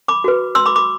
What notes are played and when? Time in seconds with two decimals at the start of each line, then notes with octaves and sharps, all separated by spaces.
0.08 B5 D6
0.24 F#4 B4
0.55 C6 E6
0.66 B5 D6
0.76 B5 D6